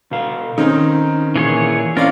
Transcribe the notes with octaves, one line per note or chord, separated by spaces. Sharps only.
B2 F5
D#3 C4 C#4 D#4
A#2 E3 G#4 C#5
C4 C#4 E4 F4 A#4 D5 F5